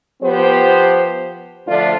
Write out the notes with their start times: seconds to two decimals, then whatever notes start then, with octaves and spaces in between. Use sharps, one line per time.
0.22 F3 B3 G4 C5
1.67 D3 F3 A3 D4 F4